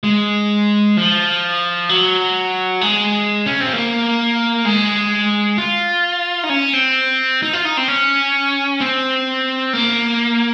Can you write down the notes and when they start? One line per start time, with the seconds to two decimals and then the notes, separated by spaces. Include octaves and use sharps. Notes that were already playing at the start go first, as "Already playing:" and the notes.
0.04 G#3
0.97 F3
1.89 F#3
2.81 G#3
3.46 C#4
3.60 C4
3.73 A#3
4.65 G#3
5.58 F4
6.43 D#4
6.50 C#4
6.73 C4
7.42 D#4
7.53 F4
7.65 D#4
7.77 C4
7.88 C#4
8.80 C4
9.73 A#3